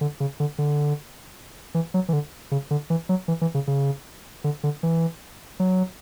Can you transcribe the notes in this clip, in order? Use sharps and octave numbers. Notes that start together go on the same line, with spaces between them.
D3
C#3
D3
D3
E3
F#3
E3
D3
C#3
D3
E3
F#3
E3
E3
C#3
C#3
D3
D3
E3
F#3